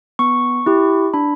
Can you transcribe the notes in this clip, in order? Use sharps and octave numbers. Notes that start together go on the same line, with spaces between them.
B3 C#6
E4 G4
D4 B5